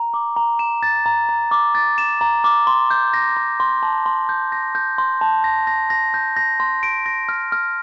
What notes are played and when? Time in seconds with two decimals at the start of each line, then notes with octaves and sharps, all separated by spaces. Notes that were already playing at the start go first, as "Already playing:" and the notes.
Already playing: A#5
0.14 D6
0.36 A#5
0.59 E7
0.83 A6
1.06 A#5
1.29 A#5
1.51 D6
1.75 A6
1.98 E7
2.21 A#5
2.44 D6
2.67 C6
2.90 G6
3.14 A#6
3.37 C6
3.60 C6
3.83 A5
4.06 C6
4.29 G6
4.52 A#6
4.75 G6
4.98 C6
5.21 A5
5.44 A#6
5.67 A#6
5.90 A#6
6.14 G6
6.37 A#6
6.60 C6
6.83 D7
7.06 A#6
7.29 F6
7.52 F6